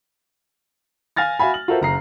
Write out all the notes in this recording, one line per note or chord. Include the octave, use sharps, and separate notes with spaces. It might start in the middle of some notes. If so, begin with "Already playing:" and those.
F5 G#5 F6 A6 A#6
F#4 E5 F5 G#5 B5
F#7
F4 F#4 A4 A#4 C5 E5
F#1 A#5 C7